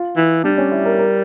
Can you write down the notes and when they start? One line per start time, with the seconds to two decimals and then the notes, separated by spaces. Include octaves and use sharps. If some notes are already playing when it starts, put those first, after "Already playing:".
Already playing: F4
0.17 E3
0.44 G3 D4
0.58 C#4
0.72 E4
0.85 A#4
0.99 A#4